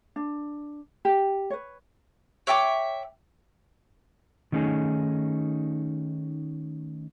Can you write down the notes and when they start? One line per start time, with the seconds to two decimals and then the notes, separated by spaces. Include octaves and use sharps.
0.16 D4
1.05 G4
1.50 B4 C#5
2.47 C#5 E5 G5 D6
4.52 D#3 A3 C#4 D#4 G#4